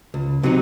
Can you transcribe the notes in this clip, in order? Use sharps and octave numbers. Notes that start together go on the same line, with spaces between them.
C#2
C3 F#3 C4 D#4